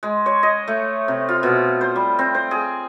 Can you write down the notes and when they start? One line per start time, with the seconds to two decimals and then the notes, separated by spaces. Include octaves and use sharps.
0.03 G#3
0.26 C#5
0.43 D#5
0.68 A3
1.08 C3
1.29 F4
1.43 B2
1.81 C5
1.96 G3
2.19 C4
2.35 C5
2.51 G#4